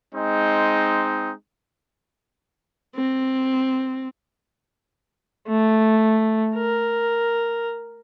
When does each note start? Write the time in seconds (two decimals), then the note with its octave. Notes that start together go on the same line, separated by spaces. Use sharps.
0.13 G#3 C4 D#4
2.96 C4
5.48 A3
6.56 A#4